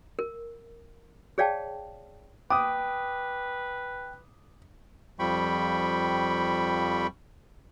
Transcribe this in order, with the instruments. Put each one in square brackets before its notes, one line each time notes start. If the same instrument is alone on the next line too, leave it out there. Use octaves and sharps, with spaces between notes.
[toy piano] A#4
G#4 C#5 D5 F5 G5 A5
[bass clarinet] B4 [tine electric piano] G5 [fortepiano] D6 D#6
[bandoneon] F2 F3 G3 G5 B5 C#6